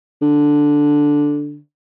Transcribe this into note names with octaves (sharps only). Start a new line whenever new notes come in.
D3